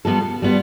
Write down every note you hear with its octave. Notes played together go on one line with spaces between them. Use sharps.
G3 B3 F4 A4
G3 B3 F4